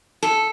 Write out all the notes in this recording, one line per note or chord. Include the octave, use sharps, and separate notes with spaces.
A4